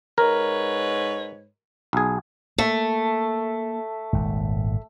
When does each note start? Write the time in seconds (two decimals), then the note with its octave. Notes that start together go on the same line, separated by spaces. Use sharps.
0.18 G#2 A#4 B4 C#5
1.93 B1 G#4
2.58 A3 A#3
4.13 D#1 G#1 G#2